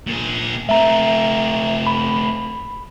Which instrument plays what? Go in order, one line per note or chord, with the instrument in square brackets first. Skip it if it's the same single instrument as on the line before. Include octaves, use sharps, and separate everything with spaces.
[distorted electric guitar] A#2 G#4
[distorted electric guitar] A3 C4 [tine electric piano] E5 A#5
[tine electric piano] B5